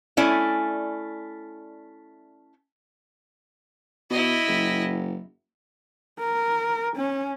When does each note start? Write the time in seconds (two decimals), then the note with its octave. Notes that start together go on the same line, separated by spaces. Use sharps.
0.17 A3 C#4 E4 D5 G#5
4.10 B2 E4 D#5
4.48 F#1
6.19 A#4
6.97 C#4